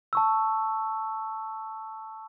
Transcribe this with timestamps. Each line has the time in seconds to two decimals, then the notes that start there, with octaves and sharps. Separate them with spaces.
0.13 A5 C#6 E6